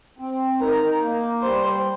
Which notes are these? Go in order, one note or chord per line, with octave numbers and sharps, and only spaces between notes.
C4
D#4 A#4
A#3
G3 C5